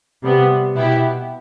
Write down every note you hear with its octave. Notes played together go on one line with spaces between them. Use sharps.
C3 G3 B3
B2 B3 E4 G4